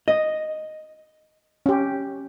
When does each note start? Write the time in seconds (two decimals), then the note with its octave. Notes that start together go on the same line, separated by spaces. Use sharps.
0.08 D#5
1.66 C#4 G4